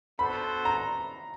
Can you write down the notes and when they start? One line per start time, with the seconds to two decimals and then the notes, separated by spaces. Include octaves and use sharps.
0.18 B3 D4 F#4 A4 C5 B5
0.65 A#5